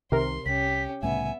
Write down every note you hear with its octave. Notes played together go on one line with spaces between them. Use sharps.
C2 C3 D#3 A#4 C6
C2 C#4 G4 B6
C2 A2 C#3 B3 E5 G#5